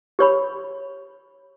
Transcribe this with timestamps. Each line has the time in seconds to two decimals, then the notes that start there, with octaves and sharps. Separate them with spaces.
0.19 G4 C#5 B5